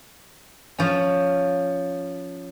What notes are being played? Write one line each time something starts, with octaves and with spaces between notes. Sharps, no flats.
F3 C#4